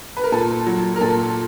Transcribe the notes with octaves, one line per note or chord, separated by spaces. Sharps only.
B4
A#4
A#2 A4
F#3
A#4
A#2 A4